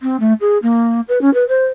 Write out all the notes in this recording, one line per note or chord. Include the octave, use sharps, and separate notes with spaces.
C4
A3
G#4
A#3
B4
C#4
B4
C5